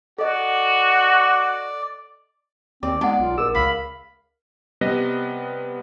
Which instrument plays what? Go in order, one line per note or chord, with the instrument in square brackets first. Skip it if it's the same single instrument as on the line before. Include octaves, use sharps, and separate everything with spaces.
[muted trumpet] F#4 [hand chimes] A4 D#5 [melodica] D5
[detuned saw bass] D#2 [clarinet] C4 [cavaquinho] D5
[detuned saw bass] G#3 [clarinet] B3 [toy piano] D#4 F#5 [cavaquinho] D5
[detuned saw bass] B1 [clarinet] F4
[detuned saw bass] A#1 [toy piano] G#4 A#4 [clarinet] E6
[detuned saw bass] C#2 [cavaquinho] F5 [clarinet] B5
[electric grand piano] C3 G3 B3 B4 D#5 A#6